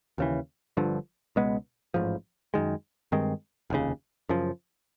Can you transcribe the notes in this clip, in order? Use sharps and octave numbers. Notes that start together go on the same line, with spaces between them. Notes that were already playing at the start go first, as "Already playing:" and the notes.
D#2 C#3 E3
G1 G2 D3 F3
C#2 B2 G#3 B3
A1 G#2 F3
F#2 D#3 G#3
G2 D#3 G#3 C4
F1 D#2 C#3
F#2 C#3 F3